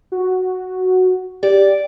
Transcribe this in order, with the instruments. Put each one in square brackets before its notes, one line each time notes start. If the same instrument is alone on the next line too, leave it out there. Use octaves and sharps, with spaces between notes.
[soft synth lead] F#4
[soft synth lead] G4 [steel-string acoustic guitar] D5